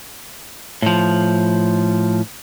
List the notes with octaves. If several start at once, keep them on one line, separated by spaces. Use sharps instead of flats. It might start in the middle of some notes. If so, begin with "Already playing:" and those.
A2 F3